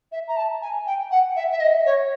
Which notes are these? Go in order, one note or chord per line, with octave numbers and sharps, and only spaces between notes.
E5
A#5
A5
G#5
G5
F#5
E5
E5
D#5
C#5